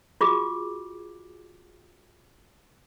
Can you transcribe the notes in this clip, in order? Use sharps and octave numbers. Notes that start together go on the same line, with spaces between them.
F4 F#4 G#4 D6